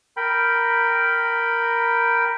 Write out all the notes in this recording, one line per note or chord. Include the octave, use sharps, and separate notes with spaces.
A#4 G5 B5